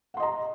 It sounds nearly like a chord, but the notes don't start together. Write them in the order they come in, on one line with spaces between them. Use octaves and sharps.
F#5 C6 D#5 A#5